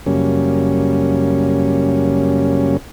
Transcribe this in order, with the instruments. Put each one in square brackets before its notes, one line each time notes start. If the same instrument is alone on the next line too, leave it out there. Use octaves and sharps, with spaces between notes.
[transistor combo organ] F#2 C#3 G3 A#3 C#4